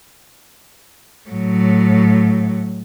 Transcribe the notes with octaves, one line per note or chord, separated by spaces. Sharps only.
A2 F#3